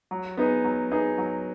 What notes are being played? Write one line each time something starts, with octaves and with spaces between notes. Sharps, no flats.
F#3
B3 D#4 G#4
F#3
B3 D#4 G#4
F#3